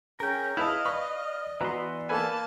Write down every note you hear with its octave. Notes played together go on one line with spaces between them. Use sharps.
C#4 G#4 A#4 G5
E4 B4 D#5 F5 A5
B4 D5 B5 C#6
E3 B3 F#4 B4 A#5 C6
A#3 A4 B4 G#5 A5